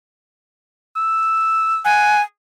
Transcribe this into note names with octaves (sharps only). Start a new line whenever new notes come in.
E6
F#5 G#5